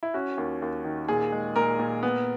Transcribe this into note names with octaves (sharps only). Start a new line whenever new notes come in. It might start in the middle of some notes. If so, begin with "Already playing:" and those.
E4
C#4 F#4
D#2
D#2
D#3
A#2 G#4
G#3
A#2 A#4
A#2
B3